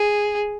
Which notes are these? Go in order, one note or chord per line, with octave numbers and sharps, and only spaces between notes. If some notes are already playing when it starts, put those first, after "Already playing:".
Already playing: G#4